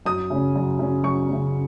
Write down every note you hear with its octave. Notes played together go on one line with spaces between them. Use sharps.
F#2 D#6
C#3 F#3 C#4
F#2
C#3 F#3 C#4
F#2 C#6
C#3 F#3 C#4